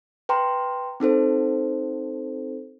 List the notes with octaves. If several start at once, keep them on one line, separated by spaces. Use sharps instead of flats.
B4 G5 A#5 C6
C4 D#4 A4 C5